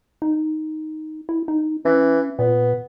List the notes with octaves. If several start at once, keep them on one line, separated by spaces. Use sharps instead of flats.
D#4
E4
D#4
E3 C#4
A#2 B3